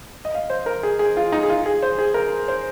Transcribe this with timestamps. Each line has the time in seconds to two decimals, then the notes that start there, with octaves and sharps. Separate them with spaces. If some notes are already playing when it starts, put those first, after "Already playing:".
0.25 D#5
0.34 F5
0.50 C5
0.66 A#4
0.83 G#4
0.99 G#4
1.17 F4
1.32 D#4
1.43 G#4
1.50 F4
1.66 G#4
1.82 C5
1.99 G#4
2.14 A#4
2.48 C5